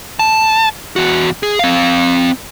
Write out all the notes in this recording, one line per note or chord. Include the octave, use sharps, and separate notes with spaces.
A5
E2 F#4
G#4
C4 F5